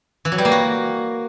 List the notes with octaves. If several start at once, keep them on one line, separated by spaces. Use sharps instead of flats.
E3
F#3
G3
A#3
F#4